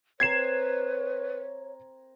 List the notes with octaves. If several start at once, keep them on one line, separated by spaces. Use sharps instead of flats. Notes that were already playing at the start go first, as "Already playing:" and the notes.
C4 A#4 B4 C#5 G#6 C7 E7